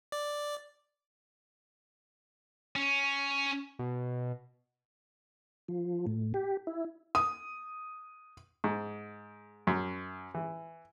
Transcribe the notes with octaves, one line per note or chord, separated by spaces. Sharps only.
D5
C#4
B2
F3
A2
G4
E4
D#6
G#2
F#2
E3